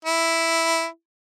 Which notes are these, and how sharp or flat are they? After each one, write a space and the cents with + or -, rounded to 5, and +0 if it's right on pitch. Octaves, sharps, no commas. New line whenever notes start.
E4 +0